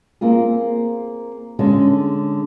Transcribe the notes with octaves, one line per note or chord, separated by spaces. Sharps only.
A#3 C4 F4 G#4
D3 G#3 C#4 A4